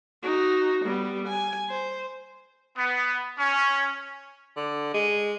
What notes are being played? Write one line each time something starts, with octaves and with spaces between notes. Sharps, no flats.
D#4 F#4
G3 B3
G#5
C5
B3
C#4
D3
G#3